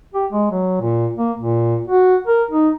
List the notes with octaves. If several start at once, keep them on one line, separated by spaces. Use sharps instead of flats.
G4
G#3
F#3
A#2
A#3
A#2
F#4
A#4
D#4